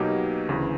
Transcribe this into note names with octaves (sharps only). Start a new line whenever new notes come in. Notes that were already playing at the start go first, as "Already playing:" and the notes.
Already playing: B2 F#3 A#3 D#4 G4
D2 C#3 E3